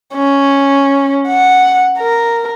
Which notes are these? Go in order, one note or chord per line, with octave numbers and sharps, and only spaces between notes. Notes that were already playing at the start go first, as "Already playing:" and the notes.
C#4
F#5
A#4